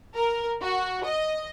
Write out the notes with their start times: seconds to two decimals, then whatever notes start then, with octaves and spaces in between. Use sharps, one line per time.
0.16 A#4
0.62 F#4
1.05 D#5